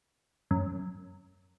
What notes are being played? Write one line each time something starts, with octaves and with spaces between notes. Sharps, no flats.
F#2